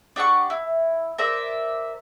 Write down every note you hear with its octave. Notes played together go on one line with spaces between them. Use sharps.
D4 G4 F#5 C#6
E4
A#4 C5 D5 E5